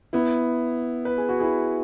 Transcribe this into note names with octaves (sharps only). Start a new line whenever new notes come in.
B3 E4
B4
G#4
F#4
E4 G#4